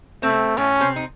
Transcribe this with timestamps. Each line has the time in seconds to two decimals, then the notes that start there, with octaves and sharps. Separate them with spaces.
0.22 C3 A3 C4
0.57 A2 A3 C#4
0.80 C3 C4
0.96 D#4